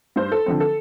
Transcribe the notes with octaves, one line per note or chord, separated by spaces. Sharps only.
G2 C5
A4
D3 F3 C4
A4